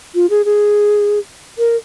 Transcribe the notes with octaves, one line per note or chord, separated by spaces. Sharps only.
F4
G#4
G#4
A#4